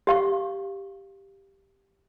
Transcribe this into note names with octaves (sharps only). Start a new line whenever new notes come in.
G4 F5 C#6